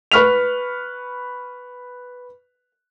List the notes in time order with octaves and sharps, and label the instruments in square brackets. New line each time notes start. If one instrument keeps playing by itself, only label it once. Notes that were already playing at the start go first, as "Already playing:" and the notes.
[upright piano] B4 C#6 F6 B6 F7